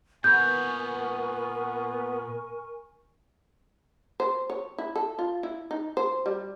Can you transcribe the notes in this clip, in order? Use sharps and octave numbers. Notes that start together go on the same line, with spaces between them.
A#2 B3 A#4 C#5 G#5 C#6 G6
C5
C#5
E4
A4
F4
E4
D#4
C5
G3